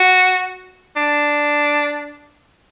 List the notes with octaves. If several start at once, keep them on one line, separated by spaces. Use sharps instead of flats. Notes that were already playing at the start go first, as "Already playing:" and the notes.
Already playing: F#4
D4